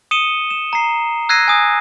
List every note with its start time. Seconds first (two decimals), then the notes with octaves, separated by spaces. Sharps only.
0.11 D#6 C#7 D#7 E7 G7
0.51 E7
0.73 A#5 C7
1.29 E6 F#6 G#6 A#6 C7 D#7
1.48 G#5 D#6